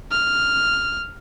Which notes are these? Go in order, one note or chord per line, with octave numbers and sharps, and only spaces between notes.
F6